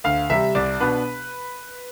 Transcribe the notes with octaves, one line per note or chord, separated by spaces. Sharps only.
D2 F5
C3 G3 E5
C2 D5
B2 B3 D4 B4